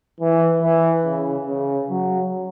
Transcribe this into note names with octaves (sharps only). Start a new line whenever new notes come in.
E3
E3
C#3
C#3
F#3